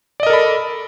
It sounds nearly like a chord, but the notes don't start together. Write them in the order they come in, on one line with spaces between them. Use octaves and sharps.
D5 D#5 A#4 A4 B5